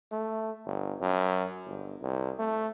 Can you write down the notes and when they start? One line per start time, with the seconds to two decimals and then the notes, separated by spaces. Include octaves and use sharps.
0.12 A3
0.65 G1
1.01 F#2
1.66 G1
2.01 C2
2.39 A3